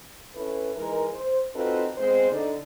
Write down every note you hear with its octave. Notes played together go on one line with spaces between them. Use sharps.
C#4 E4 A4 B4
E3 G#3 D#4 E4 A#4
C5
C4 D#4 F4 F#4 A4 B4
G#3 B3 C4 C5
D3 D#4 D5